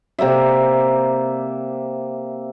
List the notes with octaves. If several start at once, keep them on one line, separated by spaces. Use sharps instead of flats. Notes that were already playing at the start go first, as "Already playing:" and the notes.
C3 A#3 D5 E5